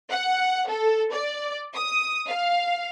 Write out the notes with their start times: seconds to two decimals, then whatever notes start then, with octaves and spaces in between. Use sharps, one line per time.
0.11 F#5
0.68 A4
1.13 D5
1.74 D#6
2.28 F5